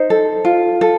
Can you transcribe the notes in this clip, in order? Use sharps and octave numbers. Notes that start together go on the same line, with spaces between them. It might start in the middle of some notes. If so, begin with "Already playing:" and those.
Already playing: D#4 C5
A4
F4
A4